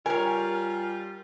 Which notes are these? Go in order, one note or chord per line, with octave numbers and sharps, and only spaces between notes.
G3 F4 A#4 C#5 G#5